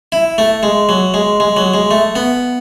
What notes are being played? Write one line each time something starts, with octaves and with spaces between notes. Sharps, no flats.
E4
A3
G#3
F#3
G#3
G#3
F#3
G#3
A3
B3